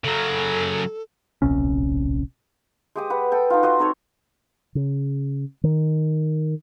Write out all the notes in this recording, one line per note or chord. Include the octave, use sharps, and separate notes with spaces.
C#3 F#3 A4
D1 A#1 C3 C#4
G#3 G4 D#6
B4 F#5
A4 G5
D#4 F4
F#4 D#5 C6
C4 D#4 A4 C#5
C#3
D#3